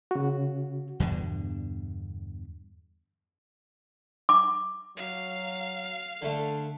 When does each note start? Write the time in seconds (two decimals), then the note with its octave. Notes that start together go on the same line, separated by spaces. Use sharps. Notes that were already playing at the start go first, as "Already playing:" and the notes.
0.11 C#3 F#4
1.00 E2 G2 B2 D3
4.29 D6
4.97 F#3 F5
6.22 D3 A3 A4